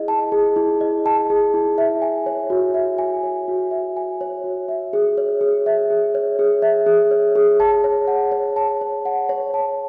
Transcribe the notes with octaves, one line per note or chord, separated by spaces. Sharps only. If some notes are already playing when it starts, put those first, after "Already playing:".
Already playing: E4 G#4 D#5
A5
G#4
E4
D#5
A5
G#4
E4
E5
G#5
C#5
F#4
E5
G#5
C#5
F#4
E5
G#5
C#5
F#4
E5
G#4
C#5
G#4
E5
G#4
C#5
G#4
E5
G#4
C#5
G#4
A5
C#5
F#5
C#5
A5
C#5
F#5
C#5
A5